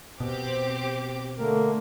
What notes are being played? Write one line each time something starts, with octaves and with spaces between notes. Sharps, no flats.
B2 C4 G4 D6
D3 A3 A#3 A#4